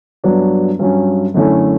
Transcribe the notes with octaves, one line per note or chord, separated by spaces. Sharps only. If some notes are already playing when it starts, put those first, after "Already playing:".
G2 F#3 B3 D4
G2 F#3 C#4
F#2 D3 A3 C#4 E4